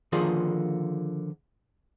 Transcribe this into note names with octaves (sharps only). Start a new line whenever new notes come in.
D3 D#3 F3 A#3 F4 G#4